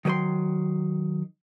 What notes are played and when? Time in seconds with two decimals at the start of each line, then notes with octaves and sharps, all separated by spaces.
0.05 D#3 F#3 B4 G5 C6